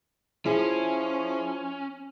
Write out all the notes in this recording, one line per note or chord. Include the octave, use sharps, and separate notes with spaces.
F3 C#4 E4 F4 G#4